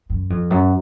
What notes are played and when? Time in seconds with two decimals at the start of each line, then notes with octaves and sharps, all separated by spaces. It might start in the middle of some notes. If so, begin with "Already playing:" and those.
0.10 F#2
0.30 F2
0.50 F#2